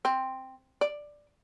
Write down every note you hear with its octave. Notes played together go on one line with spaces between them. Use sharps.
C4
D5